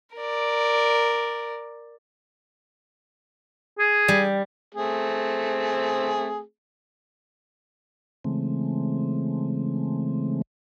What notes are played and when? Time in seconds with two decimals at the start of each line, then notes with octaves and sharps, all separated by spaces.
0.16 A#4 D5
3.79 G#4
4.08 G3
4.75 A3 C4 G#4
8.24 C#3 E3 G#3 A3 C4